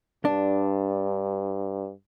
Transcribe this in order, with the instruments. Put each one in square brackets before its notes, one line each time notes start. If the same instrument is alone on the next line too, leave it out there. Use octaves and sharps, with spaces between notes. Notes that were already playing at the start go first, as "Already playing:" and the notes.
[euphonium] G2 [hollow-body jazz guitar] D4